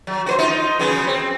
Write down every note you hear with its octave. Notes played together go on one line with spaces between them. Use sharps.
F#3
F#4 B4 C5
D#4 F4
C#3 F#3 B3
C4